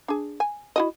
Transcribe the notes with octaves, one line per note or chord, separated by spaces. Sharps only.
D4 G#4
G#5
E4 F#4 D#5